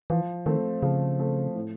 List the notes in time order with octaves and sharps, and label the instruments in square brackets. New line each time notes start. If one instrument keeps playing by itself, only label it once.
[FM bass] E3 [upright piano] F3
[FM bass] D#3 [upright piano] A3 C4
[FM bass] C#3 [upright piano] F3
[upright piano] A3 C4
A2